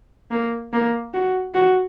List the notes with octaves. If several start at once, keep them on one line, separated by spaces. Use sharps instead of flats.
A#3
A#3
F#4
F#4